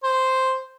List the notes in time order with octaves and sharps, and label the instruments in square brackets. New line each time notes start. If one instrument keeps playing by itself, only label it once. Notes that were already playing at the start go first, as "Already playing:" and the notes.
[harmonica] C5